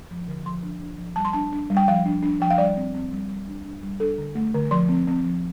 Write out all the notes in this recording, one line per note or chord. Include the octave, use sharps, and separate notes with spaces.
F3
D3
F3 C6
D4
D4
F3
G3 A5
C6
D4 A5
D4
G3
G5
F3 F5
D4
D4
F3 G5
F5
G3 D5
C4
C4
G3
G3
D4
D4
G3
D4 A4
D3
A3
D3
F3 C6
C4
C4
F3